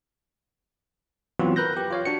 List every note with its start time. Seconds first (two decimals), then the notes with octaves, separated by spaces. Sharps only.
1.40 E3 F#3 B3 C4 F4 F#4
1.56 A#4 B4 F#6 G6 A#6
1.77 G4
1.90 F4 C#5 F5
2.05 D4 F#4 C#7